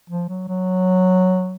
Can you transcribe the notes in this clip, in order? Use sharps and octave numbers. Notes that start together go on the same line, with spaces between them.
F3
F#3
F#3